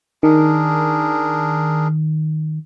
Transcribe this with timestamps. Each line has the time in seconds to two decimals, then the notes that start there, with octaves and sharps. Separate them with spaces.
0.23 D#3 D4 G#4 A#4